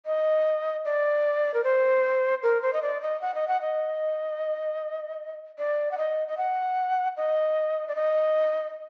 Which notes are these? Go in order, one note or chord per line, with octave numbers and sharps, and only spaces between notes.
D#5
D5
A#4
C5
A#4
C5
D#5
D5
D#5
F#5
D#5
F#5
D#5
D5
F#5
D#5
D#5
F#5
D#5
D5
D#5